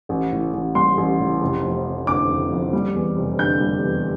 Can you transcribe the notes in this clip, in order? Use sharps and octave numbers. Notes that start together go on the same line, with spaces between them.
A1
A2
A1
G3 C6
A1
A2
F1
F2
F1
D3 D6
F1
F2
G3
E2
F1
D3 G6
G3
E2